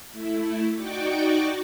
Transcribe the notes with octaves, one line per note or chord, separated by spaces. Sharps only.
A3 E4
D#4 F#4 D5 G5 C#6 D6